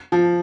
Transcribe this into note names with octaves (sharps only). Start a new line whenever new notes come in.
F3